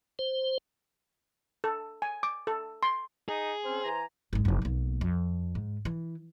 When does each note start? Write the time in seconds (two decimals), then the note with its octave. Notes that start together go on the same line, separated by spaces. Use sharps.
0.19 C5
1.64 A4
2.02 G#5
2.23 D6
2.47 A4
2.83 C6
3.29 D#4 G#4
3.65 C4 C#4 C5
3.84 E3 G#5 A#5
4.33 G#1 G#3
4.45 F1 F2
4.62 B1 A#3
5.01 F2
5.55 G#2
5.85 E3